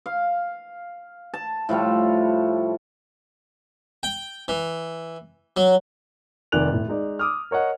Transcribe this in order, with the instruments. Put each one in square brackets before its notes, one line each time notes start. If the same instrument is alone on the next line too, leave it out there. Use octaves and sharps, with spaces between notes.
[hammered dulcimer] F5
A5
A2 F3 G3 C#5
[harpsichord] G5
E3
F#3
[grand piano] F1 D#3 D5 G#5 F#6 F7
A2
G#3 D#4 D5
D6 D#6 F6
A#4 C#5 D#5 F#5